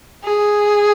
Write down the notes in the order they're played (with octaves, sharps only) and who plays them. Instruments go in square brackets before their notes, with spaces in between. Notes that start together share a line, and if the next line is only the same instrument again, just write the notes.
[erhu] G#4